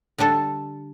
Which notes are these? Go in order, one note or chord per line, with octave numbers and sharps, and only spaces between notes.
D3 G3 D4 A4